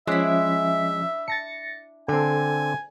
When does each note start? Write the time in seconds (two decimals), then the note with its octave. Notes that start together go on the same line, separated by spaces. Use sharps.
0.07 F3 G#3 C#4 D4 E4 E5 B6
1.28 A5 A6 A#6 C#7
2.08 D3 C4 A4 G#5